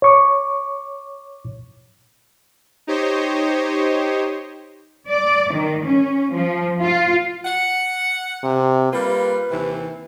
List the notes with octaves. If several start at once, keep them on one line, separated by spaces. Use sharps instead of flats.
C#5 C#6 D6
D#4 G4 C5 C#5 D#5
D5
D#3
C#4
F3
F4
F#5
C3
G3 A#3 F4 B4
D#2 C3 E3